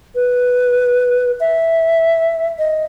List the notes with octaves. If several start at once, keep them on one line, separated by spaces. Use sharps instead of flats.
B4
E5
D#5